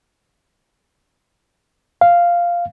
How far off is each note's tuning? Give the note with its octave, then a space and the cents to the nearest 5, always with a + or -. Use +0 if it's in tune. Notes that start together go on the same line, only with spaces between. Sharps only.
F5 -5